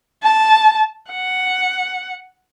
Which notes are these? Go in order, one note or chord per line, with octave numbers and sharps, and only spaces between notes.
A5
F#5